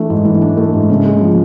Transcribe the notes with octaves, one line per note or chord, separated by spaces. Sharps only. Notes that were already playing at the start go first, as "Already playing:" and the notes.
Already playing: E3 A3 D4
G#2
E3
D4
A3
G#2
C#3
G#3
F3